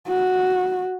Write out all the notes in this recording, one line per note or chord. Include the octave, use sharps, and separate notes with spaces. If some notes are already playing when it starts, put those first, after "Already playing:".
F#4